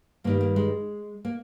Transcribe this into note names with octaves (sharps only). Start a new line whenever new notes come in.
G2 D#3 G3 A#3
A#3
G#3
A#3